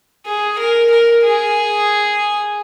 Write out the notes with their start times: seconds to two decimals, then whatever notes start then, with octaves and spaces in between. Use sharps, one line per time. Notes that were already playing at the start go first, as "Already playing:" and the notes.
0.25 G#4
0.58 A#4
0.90 A#4
1.23 G#4